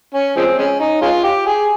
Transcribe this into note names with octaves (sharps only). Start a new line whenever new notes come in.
C#4
F3 G#3 C4
G#3 C#4
D#4
G#3 C#4 F4
G4
G#4